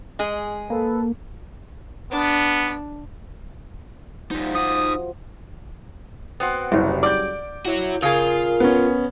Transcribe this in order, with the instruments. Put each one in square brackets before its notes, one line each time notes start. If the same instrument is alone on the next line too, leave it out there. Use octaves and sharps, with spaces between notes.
[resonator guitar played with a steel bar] G#3 G#4
[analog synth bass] A#3 [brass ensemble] A4 B4
[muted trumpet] B3 [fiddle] D4
[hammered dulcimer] F3 F#4 [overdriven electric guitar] G3 D#4
[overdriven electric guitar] D#4 F#5 [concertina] D#6
[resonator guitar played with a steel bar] B3 C4 F#4
[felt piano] F#1 C2 [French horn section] C#3 F#3 G3
[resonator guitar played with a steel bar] D5 [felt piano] D6 G6
[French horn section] E4 [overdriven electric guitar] F#4 C#5
[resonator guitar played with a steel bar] C#3 G#4 [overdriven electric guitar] F4 [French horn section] A#4
[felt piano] B3 C#4